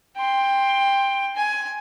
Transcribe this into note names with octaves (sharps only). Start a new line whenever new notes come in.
G5 C6
G#5